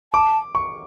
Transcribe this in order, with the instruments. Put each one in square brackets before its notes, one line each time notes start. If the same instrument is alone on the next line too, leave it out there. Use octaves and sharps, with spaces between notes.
[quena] A5 [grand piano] D6
[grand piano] C#6